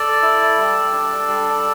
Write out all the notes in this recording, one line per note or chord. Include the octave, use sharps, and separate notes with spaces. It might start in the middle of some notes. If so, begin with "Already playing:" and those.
Already playing: A4 D5
E4
G3
D4
G3